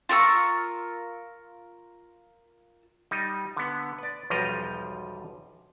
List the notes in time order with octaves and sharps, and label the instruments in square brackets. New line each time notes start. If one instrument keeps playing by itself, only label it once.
[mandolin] F4 A#4 C#6 E6
[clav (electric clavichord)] G3 D#4
D3 B3
B4 D5
B1 E2 F3 G3 D#5 A#5